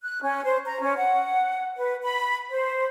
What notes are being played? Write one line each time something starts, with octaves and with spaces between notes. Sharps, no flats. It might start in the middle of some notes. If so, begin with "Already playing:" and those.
F#6
C#4
C5
A#5
C#4
F#5
B4
B5
C5